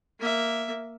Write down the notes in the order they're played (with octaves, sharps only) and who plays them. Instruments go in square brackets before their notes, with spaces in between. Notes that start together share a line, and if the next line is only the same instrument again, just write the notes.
[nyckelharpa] A#3 E5